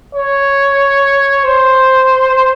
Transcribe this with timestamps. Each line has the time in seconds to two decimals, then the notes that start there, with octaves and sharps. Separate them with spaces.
0.15 C#5
1.44 C5